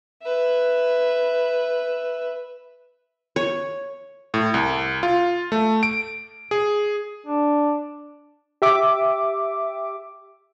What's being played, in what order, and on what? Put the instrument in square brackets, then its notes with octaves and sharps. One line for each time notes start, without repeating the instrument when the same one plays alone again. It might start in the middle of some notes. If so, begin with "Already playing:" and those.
[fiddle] B4 E5
[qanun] C#5
[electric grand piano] A2
C2
F4
A3
D7
G#4
[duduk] D4
[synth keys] G4 E5 D6